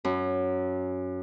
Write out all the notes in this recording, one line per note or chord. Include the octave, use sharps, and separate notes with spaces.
F#2